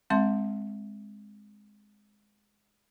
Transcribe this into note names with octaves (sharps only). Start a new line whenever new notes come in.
G#3 C4 E5 A5 C6